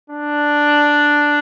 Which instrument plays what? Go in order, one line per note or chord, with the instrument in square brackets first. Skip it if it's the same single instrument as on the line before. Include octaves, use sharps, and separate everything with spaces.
[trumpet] D4